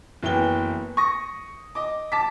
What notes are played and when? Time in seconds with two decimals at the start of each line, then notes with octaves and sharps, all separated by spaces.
0.23 F#1 E3 B3 G5 G7
0.97 C#6 D#6 A#6
1.75 D#5 D6
2.12 A5 D6 B6